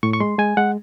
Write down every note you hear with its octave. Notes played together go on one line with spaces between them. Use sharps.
A2 C#6
C#6
G#3 C6
G#3 G#5
G#3 F#5